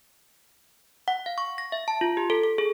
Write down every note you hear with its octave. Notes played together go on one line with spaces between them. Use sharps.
F#5
F5
C#6
A#6
E5
A5
F4
G4
A4
A4
G#4